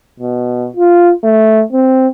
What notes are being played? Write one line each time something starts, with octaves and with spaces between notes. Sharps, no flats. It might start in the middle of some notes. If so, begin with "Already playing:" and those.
B2
F4
A3
C4